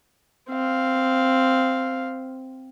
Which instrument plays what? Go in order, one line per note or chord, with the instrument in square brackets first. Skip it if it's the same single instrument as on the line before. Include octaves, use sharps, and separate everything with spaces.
[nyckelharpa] C4 F5